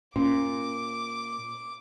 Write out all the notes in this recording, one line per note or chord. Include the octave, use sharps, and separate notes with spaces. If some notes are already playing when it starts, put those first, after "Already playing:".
A#2 C#4 D6